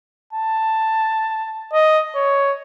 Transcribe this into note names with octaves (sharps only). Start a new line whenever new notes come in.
A5
D#5
C#5